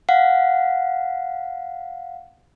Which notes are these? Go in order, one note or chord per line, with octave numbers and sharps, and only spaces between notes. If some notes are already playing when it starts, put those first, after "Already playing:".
F5 F#5